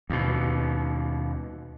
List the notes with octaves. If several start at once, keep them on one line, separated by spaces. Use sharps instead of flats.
D#2 B2